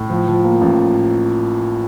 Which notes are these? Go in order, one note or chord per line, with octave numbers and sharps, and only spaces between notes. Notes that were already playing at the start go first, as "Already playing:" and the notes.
Already playing: A2
F3
F3
A#3
A1